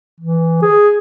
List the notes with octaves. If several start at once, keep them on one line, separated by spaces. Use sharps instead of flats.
E3
G#4